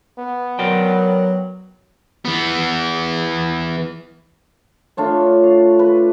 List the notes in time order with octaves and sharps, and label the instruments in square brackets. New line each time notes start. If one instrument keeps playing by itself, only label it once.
[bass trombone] B3
[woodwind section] F#3 [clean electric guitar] A#4 D5 G5
[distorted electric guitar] E3 B3
[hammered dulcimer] A3 D4 F4 C#5
F5
B4